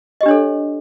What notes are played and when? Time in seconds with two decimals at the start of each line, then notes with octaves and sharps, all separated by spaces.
0.21 D#5
0.23 G4
0.26 D4
0.28 C#5
0.31 A4